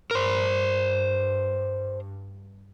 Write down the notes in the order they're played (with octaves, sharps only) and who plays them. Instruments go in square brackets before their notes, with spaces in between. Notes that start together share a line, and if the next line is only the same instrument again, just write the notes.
[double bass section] G2 [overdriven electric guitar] A#4 C5